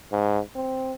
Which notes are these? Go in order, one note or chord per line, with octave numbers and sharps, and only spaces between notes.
G#2
C4